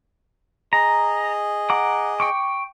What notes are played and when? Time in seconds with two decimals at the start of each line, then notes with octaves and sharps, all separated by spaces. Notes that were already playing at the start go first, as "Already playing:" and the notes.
0.73 G#4 D#5 A#5
1.70 F#5 A#5 D6
2.20 G5 C#6 D6